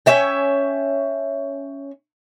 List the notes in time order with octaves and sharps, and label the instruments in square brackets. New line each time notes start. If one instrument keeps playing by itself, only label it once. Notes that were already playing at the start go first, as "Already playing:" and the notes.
[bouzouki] C#4 C#5 E5 G5